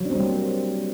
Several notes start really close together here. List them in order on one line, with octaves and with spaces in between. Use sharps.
F#3 D4 C4 G3 A#3